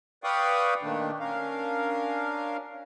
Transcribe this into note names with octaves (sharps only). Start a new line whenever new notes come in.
B4 D5 F5 G5 C#6 D#6
A#2 D#3 A3 D4
C#4 D4 A#4 F5